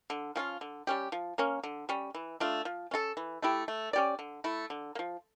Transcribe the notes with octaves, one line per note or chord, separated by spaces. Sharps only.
D3
F3 C#4 F4
D3
G3 C#4 G4
F3
A#3 C#4
D3
G3 C#4
E3
A3 D4 F4
F3
C#4 F4 A4
E3
A3 E4 G4
A3
C#4 G4 D5
D3
A3 E4
D3
A#3
F3